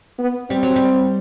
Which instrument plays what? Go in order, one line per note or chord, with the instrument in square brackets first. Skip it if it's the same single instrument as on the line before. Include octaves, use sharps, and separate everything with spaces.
[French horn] B3
[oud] G3 [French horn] C4
[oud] F#3
G3